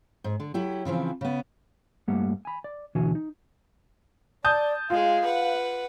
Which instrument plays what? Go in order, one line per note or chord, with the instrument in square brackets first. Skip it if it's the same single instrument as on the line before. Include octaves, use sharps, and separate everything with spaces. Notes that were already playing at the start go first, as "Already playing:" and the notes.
[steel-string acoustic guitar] G#2
D3
F#3 E4 G4
C#3 E3 F3 C4
C#3 B3
[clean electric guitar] G2 G3 A3 A#3 F#5
G#5 B5
D5
D2 B2 D3 E3 F#4 G#5
D#4
[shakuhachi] D5 [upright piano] A5 D#6 G6
[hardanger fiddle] G#3 G#4 [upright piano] F4 [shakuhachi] F5
[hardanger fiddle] B4 F#5